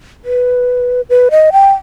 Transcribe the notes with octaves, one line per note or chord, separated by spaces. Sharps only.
B4
B4
D#5
G5